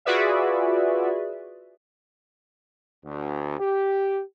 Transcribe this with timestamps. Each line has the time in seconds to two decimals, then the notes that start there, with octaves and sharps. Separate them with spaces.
0.05 F4 F#4 G#4 B4 D5 E5
3.04 D2
3.59 G4